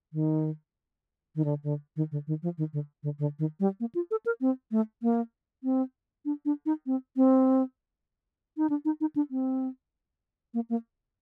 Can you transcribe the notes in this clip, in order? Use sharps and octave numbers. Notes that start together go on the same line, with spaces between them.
D#3
D#3
D3
D3
D#3
D3
D#3
F3
D#3
D3
D3
D3
D#3
G3
A#3
F4
A4
A#4
C4
A3
A#3
C4
D4
D4
D#4
C4
C4
D#4
D4
D#4
D#4
D4
C4
A#3
A#3